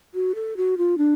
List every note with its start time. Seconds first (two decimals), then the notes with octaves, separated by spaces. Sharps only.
0.14 F#4
0.35 A4
0.57 F#4
0.78 F4
0.98 D4